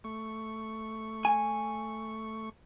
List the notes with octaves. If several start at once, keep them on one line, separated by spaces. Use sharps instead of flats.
A3 C#6
G#5